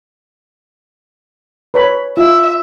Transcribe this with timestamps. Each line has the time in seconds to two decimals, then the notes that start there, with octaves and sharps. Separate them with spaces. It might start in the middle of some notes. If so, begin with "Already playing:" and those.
1.74 B4 C#5 B5
2.17 F4 E5